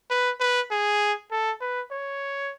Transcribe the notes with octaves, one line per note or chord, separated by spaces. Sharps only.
B4
B4
G#4
A4
B4
C#5